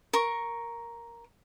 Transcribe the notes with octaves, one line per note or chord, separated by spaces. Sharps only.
A#4 C#6